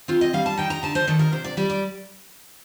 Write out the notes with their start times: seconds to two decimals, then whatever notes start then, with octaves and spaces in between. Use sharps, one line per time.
0.08 C4 F4
0.21 D#5
0.33 G3 F5
0.46 A5
0.57 D#4 G5
0.70 A#5
0.83 D3 A5
0.95 C5
1.07 D#3 A4
1.19 A#4
1.32 C3 C5
1.44 D5
1.57 G3 D5
1.70 D5